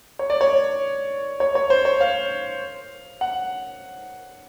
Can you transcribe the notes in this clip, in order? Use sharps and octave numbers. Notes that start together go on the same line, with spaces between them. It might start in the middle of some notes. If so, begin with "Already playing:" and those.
C#5
D5
C#5
C#5
C#5
C5
C#5
F5
F#5